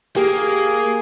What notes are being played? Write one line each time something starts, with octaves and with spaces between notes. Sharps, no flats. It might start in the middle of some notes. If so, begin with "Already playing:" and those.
A#3 G4 G#4